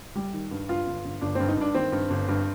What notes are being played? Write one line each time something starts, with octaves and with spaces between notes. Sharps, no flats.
G3
D#3
G2
G2 F4
G1
G1
G1 D4
G2 C4
D#4
G2 D4
D#3 C4
G2
G1
G2